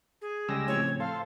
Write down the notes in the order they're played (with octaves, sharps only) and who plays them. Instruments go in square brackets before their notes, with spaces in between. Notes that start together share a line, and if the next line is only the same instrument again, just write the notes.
[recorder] G#4
[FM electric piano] C#2 A#6 [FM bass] C#3 [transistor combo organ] G3 G#3 E6
[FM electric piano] A2 F3 C4 [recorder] C#5
[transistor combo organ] A4 C5 [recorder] F5